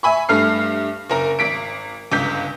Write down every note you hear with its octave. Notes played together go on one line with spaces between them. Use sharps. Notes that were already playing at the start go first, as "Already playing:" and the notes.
E5 G#5 B5 C#6
G2 A3 F6 C7
F#1 A#4 A#5
G#1 B6 D7
G1 C#2 G6 B6